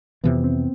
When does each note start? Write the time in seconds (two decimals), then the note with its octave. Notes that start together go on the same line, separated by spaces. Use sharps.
0.24 F2 C3 E3 B3
0.44 C4